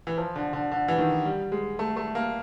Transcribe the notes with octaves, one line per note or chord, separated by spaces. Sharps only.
E3
F3
D3
D3
D3
E3
D#3
G3
G#3
A3
A3
A#3